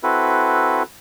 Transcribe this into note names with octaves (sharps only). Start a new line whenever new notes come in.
C4 E4 F#4 A4 B4